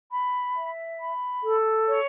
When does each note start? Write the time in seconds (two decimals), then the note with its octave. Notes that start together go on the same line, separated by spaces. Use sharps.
0.12 B5
0.56 E5
1.00 B5
1.43 A4
1.87 C#5